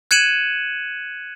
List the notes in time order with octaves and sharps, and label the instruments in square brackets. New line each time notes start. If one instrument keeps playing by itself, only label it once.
[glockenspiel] F#6 G#6 C#7 D#7 E7 F#7